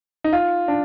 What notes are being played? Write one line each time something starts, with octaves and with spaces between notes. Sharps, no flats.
D#4
F4
D4